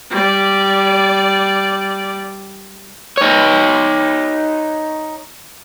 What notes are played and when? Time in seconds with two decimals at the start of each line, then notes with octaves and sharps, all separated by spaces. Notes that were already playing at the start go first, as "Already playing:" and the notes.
0.10 G3 D5
3.17 D#4 C#5